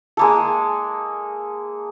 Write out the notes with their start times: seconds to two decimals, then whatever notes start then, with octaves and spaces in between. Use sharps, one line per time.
0.17 G#3 A#3 A4